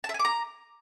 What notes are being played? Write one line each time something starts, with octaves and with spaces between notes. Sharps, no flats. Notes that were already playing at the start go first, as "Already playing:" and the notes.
A5
E5
G#5
D6
A#5